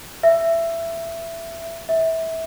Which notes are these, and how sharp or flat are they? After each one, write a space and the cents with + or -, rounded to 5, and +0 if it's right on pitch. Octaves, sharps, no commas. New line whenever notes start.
E5 +15
E5 -20